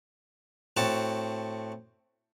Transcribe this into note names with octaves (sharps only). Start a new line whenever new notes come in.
A2 C4 F#4 A5